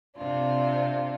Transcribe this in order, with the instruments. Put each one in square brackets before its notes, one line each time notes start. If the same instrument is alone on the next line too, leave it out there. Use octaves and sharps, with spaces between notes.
[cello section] C3 [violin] D4 F4